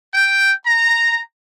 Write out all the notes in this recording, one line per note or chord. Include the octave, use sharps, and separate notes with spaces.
G5
A#5